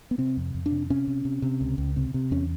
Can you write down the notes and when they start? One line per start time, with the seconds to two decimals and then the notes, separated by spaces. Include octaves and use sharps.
0.11 B3
0.18 C3 C4
0.37 F2
0.55 F2
0.66 D4
0.71 C3
0.90 C3 C#4
1.07 C3
1.25 C3
1.42 C3
1.61 C#2
1.78 C#2
1.96 C3
2.14 C3
2.31 E2 C#4